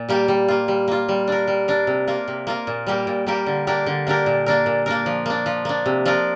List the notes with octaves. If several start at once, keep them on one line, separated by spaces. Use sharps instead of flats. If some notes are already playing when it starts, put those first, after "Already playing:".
Already playing: A#2
G3 A#3 G4
G3
A#3 F4
G3
A#3 F4
G3
D4 A#4
G3
D4 A#4
C3
A#3 F4 A#4
C3
A#3 F4 A#4
A#2
G3 A#3 G4 A#4
A#2
G3 A#3 G4 A#4
D3
A#3 D4 G4 A#4
D3
A#3 D4 G4 A#4
A#2
A#3 D4 A#4
A#2
A#3 D4 A#4
F3
A#3 D4
F3
A#3 D4
C3
F3 D4 A#4